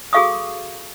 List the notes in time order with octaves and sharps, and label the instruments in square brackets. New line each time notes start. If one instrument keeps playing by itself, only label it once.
[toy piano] F#4 G#4 A4 F5 C#6 D#6